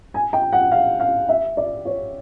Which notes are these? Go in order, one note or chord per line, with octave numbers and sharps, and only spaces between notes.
G#5
G5
F#5
F5
F5
E5
D5
C#5